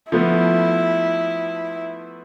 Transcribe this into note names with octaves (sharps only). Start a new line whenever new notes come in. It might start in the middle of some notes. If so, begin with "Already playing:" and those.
F3 A3 B3 E4